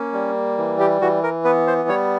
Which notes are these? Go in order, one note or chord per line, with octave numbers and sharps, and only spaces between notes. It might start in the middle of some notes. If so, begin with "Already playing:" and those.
Already playing: A#3 C#4
G3
E3
G4
E3 F#4
A#4
B3 B4
C5
G3 C#5